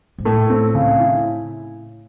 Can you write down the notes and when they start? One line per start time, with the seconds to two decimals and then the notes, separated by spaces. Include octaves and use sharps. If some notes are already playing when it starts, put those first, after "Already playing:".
0.18 G#2
0.25 A2 A3
0.50 C4
0.75 C#3
1.00 E4